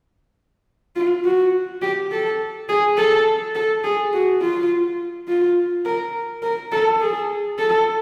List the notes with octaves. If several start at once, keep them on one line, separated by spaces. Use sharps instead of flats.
F4
F#4
G4
A4
G#4
A4
A4
G#4
F#4
F4
F4
A#4
A#4
A4
G#4
A4